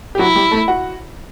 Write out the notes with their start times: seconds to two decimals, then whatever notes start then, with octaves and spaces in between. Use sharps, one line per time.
0.15 G4
0.19 F#3 E4 F#4
0.36 G3 G4
0.51 A3 A4
0.68 F#4 F#5